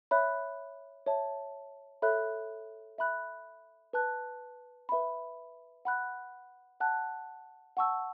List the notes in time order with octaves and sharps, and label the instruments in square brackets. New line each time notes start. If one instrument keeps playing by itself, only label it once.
[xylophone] C#5 E5 B5 F#6
C#5 E5 A5
A4 C#5 E5 B5 F#6
E5 B5 F#6
B4 A5 F#6
B4 E5 B5
F#5 B5 F#6
F#5 A5 F#6
F#5 A5 C#6 E6